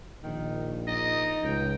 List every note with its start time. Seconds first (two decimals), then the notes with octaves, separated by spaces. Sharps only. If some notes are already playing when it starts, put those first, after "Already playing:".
0.23 A#1 D#3
0.87 D#4 D#5
1.43 C#2 G5